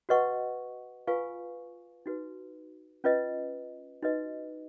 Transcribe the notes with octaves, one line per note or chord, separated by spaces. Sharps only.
F#4 B4 D#5 F#5 C#6
F4 B4 F5 G#5 C#6
D#4 F#4 B4
C#4 F4 B4 D#5
D#4 F#4 B4 D#5